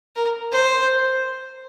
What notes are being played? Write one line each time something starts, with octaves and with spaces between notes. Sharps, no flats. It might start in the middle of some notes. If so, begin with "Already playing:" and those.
A#4
C5